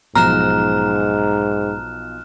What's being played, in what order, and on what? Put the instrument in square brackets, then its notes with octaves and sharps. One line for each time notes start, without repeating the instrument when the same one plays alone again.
[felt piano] B1 F3 [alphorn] G#2 [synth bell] A#5 [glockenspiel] F6 F#6 E7